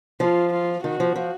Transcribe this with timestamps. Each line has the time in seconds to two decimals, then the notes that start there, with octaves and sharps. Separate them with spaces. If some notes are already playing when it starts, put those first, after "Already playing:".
0.20 F3 F4
0.52 F4
0.84 D#3 F#4
1.00 F3
1.16 F3